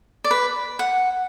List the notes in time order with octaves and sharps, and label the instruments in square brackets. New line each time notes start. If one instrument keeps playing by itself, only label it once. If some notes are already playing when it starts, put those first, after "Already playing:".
[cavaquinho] D5
B4
F#5